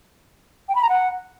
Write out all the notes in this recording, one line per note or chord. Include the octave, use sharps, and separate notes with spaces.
G5
B5
A#5
F#5